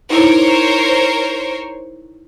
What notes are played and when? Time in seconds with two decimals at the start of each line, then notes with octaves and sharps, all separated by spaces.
0.10 D#4 E4 A#4 C5 C#5